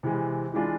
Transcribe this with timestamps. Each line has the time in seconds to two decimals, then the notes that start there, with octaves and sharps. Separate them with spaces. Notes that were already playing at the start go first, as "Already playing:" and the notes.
0.03 C3 E3 G#3
0.53 E3 G#3 D4 F4